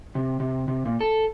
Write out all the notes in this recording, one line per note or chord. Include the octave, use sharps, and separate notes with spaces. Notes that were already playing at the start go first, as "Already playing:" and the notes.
C3
C3
C3
A#2
A4